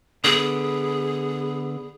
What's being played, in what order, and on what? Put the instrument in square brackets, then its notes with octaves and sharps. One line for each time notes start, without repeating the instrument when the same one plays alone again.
[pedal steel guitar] D3 B3 [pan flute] G#4